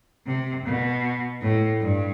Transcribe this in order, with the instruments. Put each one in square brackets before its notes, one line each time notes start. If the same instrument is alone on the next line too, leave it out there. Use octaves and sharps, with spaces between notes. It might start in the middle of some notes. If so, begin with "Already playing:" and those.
[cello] C3
B2
A2
G2